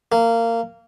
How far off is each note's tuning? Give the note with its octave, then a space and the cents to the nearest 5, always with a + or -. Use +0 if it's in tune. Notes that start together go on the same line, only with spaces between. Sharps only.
A#3 -20